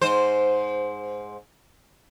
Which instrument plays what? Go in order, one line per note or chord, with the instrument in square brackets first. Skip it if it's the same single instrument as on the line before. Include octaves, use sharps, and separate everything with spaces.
[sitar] G#2 C5